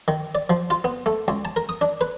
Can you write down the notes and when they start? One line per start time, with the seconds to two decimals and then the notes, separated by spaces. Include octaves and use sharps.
0.08 D#3
0.35 D5
0.50 F3
0.70 F4
0.84 B3
1.06 A3
1.28 C#2
1.45 A5
1.56 A#4
1.69 D#6
1.81 D4
2.01 B4